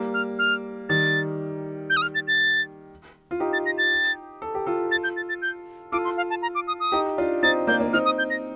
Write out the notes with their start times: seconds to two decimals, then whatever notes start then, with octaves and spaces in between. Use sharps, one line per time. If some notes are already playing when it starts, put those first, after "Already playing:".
Already playing: G3 A#3
0.14 F6
0.39 F6
0.89 D#3 G3 A6
1.90 G6
1.97 D#6
2.02 F6
2.15 A6
2.28 A6
3.31 F4
3.40 D#4 G4
3.53 A6
3.66 A#6
3.78 A6
4.42 A4
4.55 G4
4.66 F4 A4
4.91 A6
5.04 G6
5.17 A6
5.29 A6
5.42 G6
5.92 F4 A4 D6
6.05 C6
6.17 F5
6.30 A5
6.42 A#5
6.55 D6
6.67 D#6
6.80 D#6
6.92 D#4 G4
7.18 D4 F4
7.43 C4 D#4 A6
7.67 A#3 D4 G6
7.80 A#3 D4
7.93 C4 D#4 F6
8.05 D#6
8.18 G6
8.30 A#6